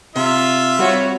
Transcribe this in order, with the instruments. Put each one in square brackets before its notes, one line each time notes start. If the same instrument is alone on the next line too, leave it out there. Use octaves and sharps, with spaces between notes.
[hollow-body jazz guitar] C3 [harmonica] F4 E5
[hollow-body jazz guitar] G3 C4 [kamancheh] F#4 C#5